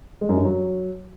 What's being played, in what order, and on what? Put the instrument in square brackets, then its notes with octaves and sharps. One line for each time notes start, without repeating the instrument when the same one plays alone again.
[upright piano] G#3
F#2
G2
F#3